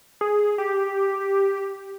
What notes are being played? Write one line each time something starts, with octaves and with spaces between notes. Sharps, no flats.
G#4
G4